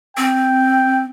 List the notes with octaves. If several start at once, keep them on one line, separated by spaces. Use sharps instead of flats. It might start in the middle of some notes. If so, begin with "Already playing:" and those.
C4 G5